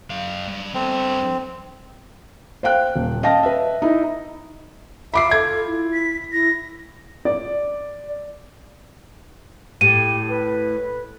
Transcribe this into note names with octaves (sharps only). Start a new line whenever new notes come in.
F#2 F5
G2
G2 C4 A4
C5 F5 G5 F#6
D#1
D#5 F5 G5 A5 A#6
B4 E5
D#4 E4
F4 E5 B5 D6 C7
A4 G#6
E4
B6
E4 A#6
D5
A2 G4 D#7
B4